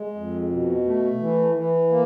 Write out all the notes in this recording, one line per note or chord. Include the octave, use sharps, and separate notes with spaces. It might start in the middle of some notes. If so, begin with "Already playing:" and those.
Already playing: G#3
F2
B2
A3
E3
E3
A#3